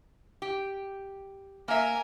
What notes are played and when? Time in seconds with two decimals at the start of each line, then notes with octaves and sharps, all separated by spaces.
0.42 G4
1.68 A#3 A#4 E5 G#5